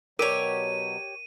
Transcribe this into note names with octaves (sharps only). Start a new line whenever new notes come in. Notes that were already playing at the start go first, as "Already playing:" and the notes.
B2 F#3 G4 A#4 C#5 D5 D#7